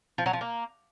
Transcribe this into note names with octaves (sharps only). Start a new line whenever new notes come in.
F3
F#3
F3
A#3